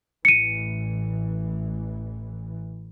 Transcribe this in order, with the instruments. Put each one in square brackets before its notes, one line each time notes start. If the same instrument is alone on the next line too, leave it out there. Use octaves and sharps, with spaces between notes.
[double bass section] A1 E3 [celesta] C#7 D#7